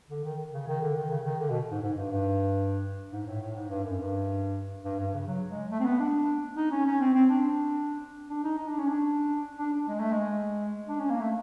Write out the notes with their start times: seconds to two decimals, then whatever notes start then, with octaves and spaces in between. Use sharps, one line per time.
0.10 D3
0.24 D#3
0.54 C#3
0.68 D#3
0.82 D3
0.96 D#3
1.10 C#3
1.25 D#3
1.40 D3
1.50 B2
1.72 G#2
1.83 G#2
1.97 G2
2.11 G2
3.12 G#2
3.27 A2
3.41 A2
3.55 G#2
3.69 G2
3.84 F#2
3.98 G2
4.85 G2
4.99 G2
5.14 C#3
5.28 F#3
5.49 G#3
5.71 A3
5.80 C4
5.85 B3
6.00 D4
6.57 D#4
6.71 C#4
6.86 C#4
7.00 C4
7.14 C4
7.29 D4
8.30 D4
8.44 D#4
8.58 D#4
8.68 D4
8.78 C#4
8.88 D4
9.59 D4
9.73 D4
9.88 G#3
10.00 A3
10.12 G#3
10.88 D4
10.99 C#4
11.10 A#3
11.21 A3